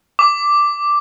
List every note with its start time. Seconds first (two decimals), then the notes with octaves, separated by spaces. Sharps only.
0.19 D6